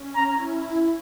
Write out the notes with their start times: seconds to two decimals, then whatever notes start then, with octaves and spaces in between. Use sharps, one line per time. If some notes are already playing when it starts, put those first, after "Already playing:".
Already playing: C#4
0.16 A#5
0.30 E4